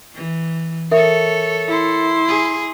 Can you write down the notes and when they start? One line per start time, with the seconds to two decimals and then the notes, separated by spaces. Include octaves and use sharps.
0.14 E3
0.92 A4 A#4 C#5 E5
1.68 E4 C6
2.28 G#4